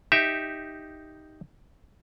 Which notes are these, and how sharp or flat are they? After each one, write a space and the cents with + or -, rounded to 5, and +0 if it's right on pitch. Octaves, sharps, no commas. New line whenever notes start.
D#4 +0 G4 +0 E5 +0